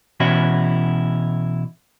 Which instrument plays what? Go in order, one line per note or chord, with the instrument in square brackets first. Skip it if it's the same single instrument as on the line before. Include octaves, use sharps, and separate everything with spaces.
[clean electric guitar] B2 E3 C#4 E4 F#4